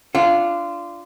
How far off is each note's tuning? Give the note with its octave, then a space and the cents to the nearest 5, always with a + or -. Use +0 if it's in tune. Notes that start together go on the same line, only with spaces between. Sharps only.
D4 +0 F4 -20 F#5 -35